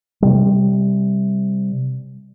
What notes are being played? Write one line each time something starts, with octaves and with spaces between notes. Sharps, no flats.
C3 G3